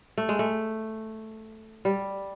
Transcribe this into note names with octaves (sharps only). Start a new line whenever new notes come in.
A3
G#3
A3
G3